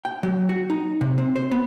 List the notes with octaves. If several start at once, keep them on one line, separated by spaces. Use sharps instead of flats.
G5
F#3
F#4
D#4
C3
C4
C5
B3